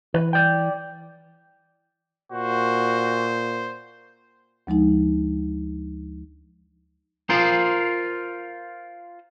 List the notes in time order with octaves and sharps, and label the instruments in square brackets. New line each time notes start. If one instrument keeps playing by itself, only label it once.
[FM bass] E3 [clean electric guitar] B4
[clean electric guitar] D5 G5
[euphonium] A#2 [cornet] F#4 [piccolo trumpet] C5
[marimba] D2 F3 G#3 D#4
[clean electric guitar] F4 A#4 C5